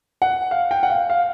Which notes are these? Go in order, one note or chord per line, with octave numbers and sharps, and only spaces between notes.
F#5
F5
G5
F#5
F5
F5